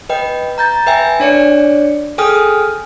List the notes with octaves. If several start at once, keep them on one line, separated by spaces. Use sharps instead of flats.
B4 D#5 G5
A#5 G6 A6
B4 E5 G5 G#5
D4 C#5 D5 C#7
G#4 A4 G5 G#5 D#6 F6